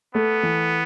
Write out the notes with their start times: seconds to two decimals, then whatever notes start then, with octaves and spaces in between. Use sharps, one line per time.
0.15 A3 B3
0.43 E3